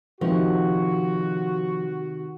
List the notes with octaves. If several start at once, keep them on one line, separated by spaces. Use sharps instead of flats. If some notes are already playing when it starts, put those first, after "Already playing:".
C3 D#3 F3 F#4 D#5